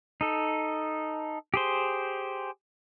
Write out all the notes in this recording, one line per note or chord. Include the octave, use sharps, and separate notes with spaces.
D#4 A4
G4 G#4 C5